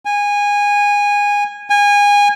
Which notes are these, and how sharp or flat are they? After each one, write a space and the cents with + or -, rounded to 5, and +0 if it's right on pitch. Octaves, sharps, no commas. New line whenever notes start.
G#5 -20
G#5 -25